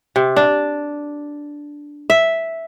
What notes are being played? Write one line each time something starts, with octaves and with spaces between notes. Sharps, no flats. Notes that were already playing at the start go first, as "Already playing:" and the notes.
C3
D4
E5